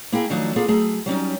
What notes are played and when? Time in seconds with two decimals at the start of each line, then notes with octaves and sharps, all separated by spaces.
0.12 A#3 E4 G#4 G5
0.30 D#3 F3 F#3 A3 D4 D#4
0.56 A#3 B3 F4 G#4 A4
0.68 F#3 A3 G#4
1.06 F#3 G3 C#4 D#4